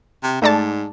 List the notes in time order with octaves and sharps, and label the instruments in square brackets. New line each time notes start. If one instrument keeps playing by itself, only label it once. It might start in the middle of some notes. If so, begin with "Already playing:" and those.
[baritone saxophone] C3
[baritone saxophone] G#2 [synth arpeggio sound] A3 D5 A5